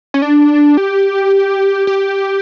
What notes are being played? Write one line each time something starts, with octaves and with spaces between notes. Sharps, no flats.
C#4
D4
G4
G4